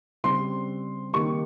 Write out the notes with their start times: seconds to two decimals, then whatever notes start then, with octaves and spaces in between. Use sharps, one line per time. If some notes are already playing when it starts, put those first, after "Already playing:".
0.24 C#3 G3 C4 C6
1.13 D#3 A#3 D#4 G4 A#4 C#6